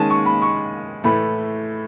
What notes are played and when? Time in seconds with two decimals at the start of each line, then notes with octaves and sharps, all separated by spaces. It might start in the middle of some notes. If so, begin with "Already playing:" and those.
Already playing: D#3 G#3 C#4 G#5 A5
0.10 C#6
0.26 B5
0.42 C#6
1.04 A2 E3 A3 B5